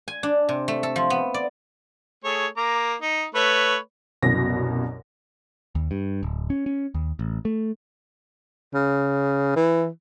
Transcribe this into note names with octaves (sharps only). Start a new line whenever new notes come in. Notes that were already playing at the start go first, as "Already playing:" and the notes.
G#5
D4
C3
A3
A4
F3
B3
D5
A3 G#4 C#5
A#3 A#5 D6
D#4
A3 B4 C#5
C2 F#2 B2 A#6
D#2
G2
D1
C#4
C#4
D#2
A1
A3
C#3
E3